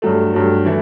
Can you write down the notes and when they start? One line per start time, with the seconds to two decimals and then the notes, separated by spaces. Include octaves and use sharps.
0.02 G2 F#3 A3
0.33 G2 F#3 A3
0.65 E3 A3 E4 A4